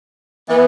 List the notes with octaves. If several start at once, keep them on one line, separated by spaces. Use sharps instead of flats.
E3 B3